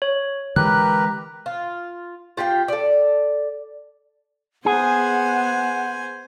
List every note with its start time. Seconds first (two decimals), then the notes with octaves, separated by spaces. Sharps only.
0.02 C#5
0.56 D3 E3 G#3 G4 A#4 B4 F#6
1.46 F4
2.37 F4 G4 F5 G5
2.68 A4 D5
4.66 B3 G#4 C5 F#5 G#5